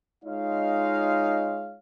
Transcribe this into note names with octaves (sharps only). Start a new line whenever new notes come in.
G#3 D#4 F4 C#5 F5